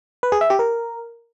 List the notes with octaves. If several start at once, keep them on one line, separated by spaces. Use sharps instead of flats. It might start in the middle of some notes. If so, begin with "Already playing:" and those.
B4
G#4
E5
G4
A#4